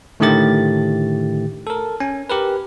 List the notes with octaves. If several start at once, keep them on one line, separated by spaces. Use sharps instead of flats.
A2 D3 D#3 A3 G4 A6
A4 A#4
C#4 G#5
G4 A#4 B4